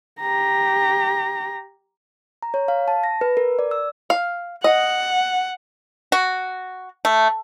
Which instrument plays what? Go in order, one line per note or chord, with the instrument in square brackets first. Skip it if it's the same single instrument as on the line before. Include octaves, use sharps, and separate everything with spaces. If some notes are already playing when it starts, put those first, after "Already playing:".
[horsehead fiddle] G4 A#5
[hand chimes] A#5
C#5
F5
A5
A#6
B4
A#4
D5
E6
[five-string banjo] F5
[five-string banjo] D#5 [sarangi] F#5
[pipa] F#4
A3